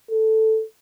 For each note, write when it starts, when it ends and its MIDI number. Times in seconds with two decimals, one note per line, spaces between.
0.11 0.64 69